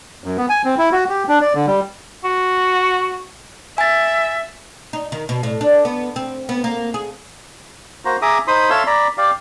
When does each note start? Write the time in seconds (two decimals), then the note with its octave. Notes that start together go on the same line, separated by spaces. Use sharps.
0.24 F#2
0.38 B3
0.49 G#5
0.65 C4
0.78 E4
0.92 F#4
1.09 G4
1.28 D4
1.41 D5
1.54 D3
1.67 G3
2.24 F#4
3.78 E5 G#5 A6
4.93 D#4
5.12 D#3
5.29 B2
5.43 A2
5.61 D4
5.85 B3
6.16 C4
6.49 B3
6.64 A#3
6.94 G#4
8.05 A#3 F#4 C5 A#5
8.22 G#4 E5 A#5 D6 D#6
8.48 D#4 C5 B5 C6 D#6
8.70 A4 C#5 E5 F5 C6 E6
8.87 D5 A#5 B5
9.18 G4 D5 F5